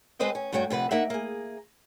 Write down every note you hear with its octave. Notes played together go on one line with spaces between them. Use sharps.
G#3 C4 B4 C5 D#5 G5
C#4
G2 A3 F#4 C#5 G5
F2 C3 B4 F#5
A#3 D#4 E5 F#5
A#3 G#4